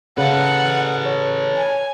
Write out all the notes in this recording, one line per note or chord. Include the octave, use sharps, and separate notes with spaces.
C#3 A4 B4 F#5
C#5
G#5